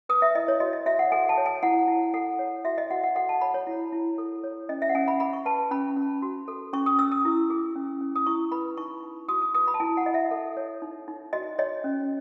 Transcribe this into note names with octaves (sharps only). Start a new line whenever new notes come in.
B4 D#6
E5
E4 D#5
C#5
F#4 D#5
D#5
F#4 E5
F#5
A4 G#5
A5
C#5
G#5
E4 F#5
E4
A4 F#5
C#5
F#4 E5
D#5
F#4 F#5
F#5
A4 F#5
A5
C#5 B5
C#5
E4
E4
A4
C#5
C#4 D#5
E5
F#5
C#4 G#5
B5
G#4 B5
C#6
B4 A5
C#4 B5
C#4
F#4
A4
C#4 C#6
D#6
C#4 E6
D#6
E4
G#4
C#4
C#4
D#6
E4 C#6
B4 B5
D#4 C#6
D#4
F#4 D#6
D#6
B4 D#6
B5
A5
E4 G#5
F#5
E4 D#5
E5
A4
C#5
D#4
D#4
F#4 D#5
C#5 D#5
C#4